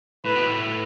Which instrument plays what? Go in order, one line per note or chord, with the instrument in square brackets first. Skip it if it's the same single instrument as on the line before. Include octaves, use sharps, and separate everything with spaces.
[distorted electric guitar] A2 [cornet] B4
[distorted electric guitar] B2
A2